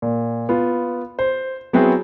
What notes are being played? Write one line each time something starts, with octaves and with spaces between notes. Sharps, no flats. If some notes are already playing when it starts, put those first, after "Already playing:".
A#2
B3 F4
C5
F#3 B3 C4 E4 F#4 G#4